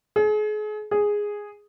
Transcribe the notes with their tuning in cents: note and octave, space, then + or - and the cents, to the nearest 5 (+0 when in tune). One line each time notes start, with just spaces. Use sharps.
G#4 +35
G#4 -5